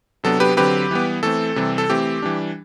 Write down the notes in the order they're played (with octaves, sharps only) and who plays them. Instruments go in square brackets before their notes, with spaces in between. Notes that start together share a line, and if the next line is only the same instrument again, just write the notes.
[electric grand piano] C3 F#3 B3 D4 A4
G4 B4
D3 F#3 C4 G4 B4
E3 G3 B3
E3 A3 C4 A4
C3 E3 G3 C4
A4
E3 A3 C4 G4
E3 G3 D4